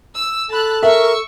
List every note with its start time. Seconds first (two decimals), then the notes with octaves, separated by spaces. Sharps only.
0.15 E6
0.49 A4 A5 B5 F#6
0.83 A#4 E5 C#6 E6